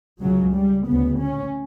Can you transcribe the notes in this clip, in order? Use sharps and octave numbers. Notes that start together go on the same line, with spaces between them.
C#2 C#3 F#3
G3
D2 C#3 B3
C#4